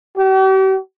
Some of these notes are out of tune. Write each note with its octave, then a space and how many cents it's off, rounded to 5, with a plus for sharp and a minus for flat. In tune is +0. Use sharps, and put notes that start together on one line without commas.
G4 -45